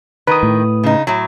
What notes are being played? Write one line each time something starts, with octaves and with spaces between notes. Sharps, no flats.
D#3 B4 D#6
A2
C#3 D#4
A2 F#3